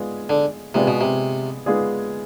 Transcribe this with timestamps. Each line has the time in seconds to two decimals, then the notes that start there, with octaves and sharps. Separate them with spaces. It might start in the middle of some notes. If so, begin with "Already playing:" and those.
Already playing: G#3 B3 F4 G#4 D5
0.29 D3
0.74 C3 G#3 B3 F4 G#4 D5
0.87 B2
1.01 C3
1.66 G#3 B3 F4 G#4 D5